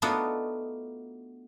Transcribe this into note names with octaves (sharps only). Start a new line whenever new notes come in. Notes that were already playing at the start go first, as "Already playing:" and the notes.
A3 B3 D4 D#4 F4 F#4